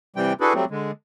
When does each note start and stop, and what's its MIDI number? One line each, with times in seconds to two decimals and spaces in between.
0.16 0.33 48
0.16 0.33 52
0.16 0.33 55
0.16 0.33 79
0.41 0.53 62
0.41 0.53 64
0.41 0.53 66
0.41 0.53 68
0.41 0.53 69
0.41 0.53 71
0.54 0.65 54
0.54 0.65 55
0.54 0.65 57
0.54 0.65 60
0.71 0.91 50
0.71 0.91 56